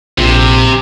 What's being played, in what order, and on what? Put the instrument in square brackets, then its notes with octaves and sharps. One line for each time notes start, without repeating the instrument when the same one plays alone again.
[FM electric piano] A#1 [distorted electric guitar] C3